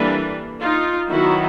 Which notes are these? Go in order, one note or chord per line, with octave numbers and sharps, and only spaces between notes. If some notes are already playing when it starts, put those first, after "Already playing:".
Already playing: E3 G3 A#3 D4 A4 B4
D#4 F4
D#3 F#3 B3 E4 F#4